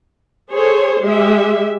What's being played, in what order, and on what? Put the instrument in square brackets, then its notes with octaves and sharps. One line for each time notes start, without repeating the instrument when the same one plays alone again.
[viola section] G#4 A4 C5 C#5
G#3 G4 E5